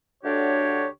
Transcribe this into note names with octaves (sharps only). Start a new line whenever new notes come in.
D2 D3 D4 G4 C#5